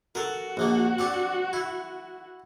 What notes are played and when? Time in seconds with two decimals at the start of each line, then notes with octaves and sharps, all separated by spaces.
0.15 F#4 A4 A#4
0.57 A#1 F3 A#3
0.99 C4 D4 G4
1.53 E4